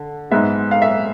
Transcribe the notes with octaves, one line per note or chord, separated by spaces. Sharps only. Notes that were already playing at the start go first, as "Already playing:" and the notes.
Already playing: D3
G#2 G#3 B3 E5
F5
E5